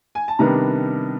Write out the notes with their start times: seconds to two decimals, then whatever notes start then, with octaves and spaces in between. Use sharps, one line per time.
0.15 G#5
0.28 A5
0.39 C3 D#3 G3 B3 D4 A#5